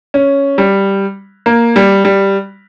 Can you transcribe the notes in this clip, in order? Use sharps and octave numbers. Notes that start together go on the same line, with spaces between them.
C#4
G3
A#3
G3
G3